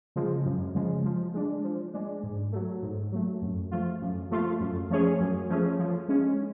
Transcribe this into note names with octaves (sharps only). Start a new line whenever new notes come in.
C#3 F3 G#3
F#2
C#3 F3 G#3
F3
G#3 D4
F3
G#3 D4
G#2
F#3 A3
G#2
F#3 A3
F#2
F3 A3 F4
F#2
F3 A3 F4
F#2
F3 A3 C#4 G#4
F#2
F3 A3 C#4 G#4
F3
G#3 C#4